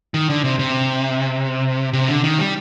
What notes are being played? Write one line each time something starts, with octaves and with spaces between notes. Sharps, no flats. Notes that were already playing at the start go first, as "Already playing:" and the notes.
D#3
D3
C3
C3
C3
D3
D#3
G3